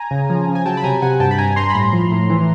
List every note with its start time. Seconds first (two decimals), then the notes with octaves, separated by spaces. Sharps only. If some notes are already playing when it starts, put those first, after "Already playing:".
Already playing: G#5 A#5
0.11 C#3
0.30 F3
0.48 C#3
0.55 G#5
0.66 F#3 G5 A5
0.77 B5
0.84 C3 G#5 A#5
1.02 C3 F#5 G#5
1.20 G2 G5 A5
1.31 B5
1.38 G2 G#5 A#5
1.56 G2 A#5 C6
1.70 B5
1.74 A2 A#5 C6
1.93 F3
2.12 A2
2.30 E3